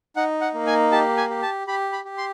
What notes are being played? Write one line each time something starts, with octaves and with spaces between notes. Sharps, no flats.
D#4 F#5
F#5
A#3
G#5
G4 A5
G#5
G4
A5
G4 B5
B5
G4
C6